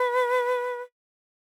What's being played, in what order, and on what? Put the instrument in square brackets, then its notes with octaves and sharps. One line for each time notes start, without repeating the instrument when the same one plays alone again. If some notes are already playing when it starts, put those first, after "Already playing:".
Already playing: [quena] B4